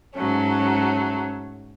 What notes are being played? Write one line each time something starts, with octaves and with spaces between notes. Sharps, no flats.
G#2 F#3 A3 C#4